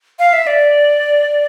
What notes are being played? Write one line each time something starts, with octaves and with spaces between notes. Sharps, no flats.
F5
E5
D5